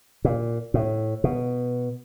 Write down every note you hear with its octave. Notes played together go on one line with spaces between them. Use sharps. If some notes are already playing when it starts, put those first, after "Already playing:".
A#2
A2
B2